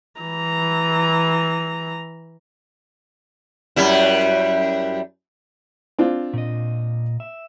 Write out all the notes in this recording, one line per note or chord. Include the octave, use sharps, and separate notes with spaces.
E3 A#5
F#2 G3 E4
C4 D4 F4
A#2 D#5
E5